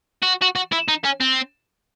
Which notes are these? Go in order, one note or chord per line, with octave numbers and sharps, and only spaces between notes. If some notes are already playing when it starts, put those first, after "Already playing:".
F#4
F#4
F#4
E4
D#4
C#4
C4